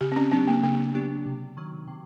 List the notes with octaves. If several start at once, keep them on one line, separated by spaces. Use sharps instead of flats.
C#3 G4
C4
C#4
F#3 B3 C4 D4 G4
A#3
C#3 A#3
F#3 B3 D4 G4
C3
D#3 F#3
C3